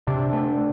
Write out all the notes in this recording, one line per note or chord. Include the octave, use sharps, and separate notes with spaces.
C3 D4
A3